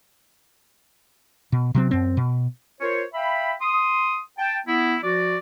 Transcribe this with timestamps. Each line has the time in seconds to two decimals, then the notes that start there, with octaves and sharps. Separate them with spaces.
1.52 B2
1.74 C3 F#3 C4
1.91 F#2 C4
2.17 B2
2.81 F4 A#4 C5 C#5
3.14 E5 F5 G5 B5
3.61 C6 D#6
4.38 G5 A5
4.67 B3 E4
5.03 F3 F#4 D5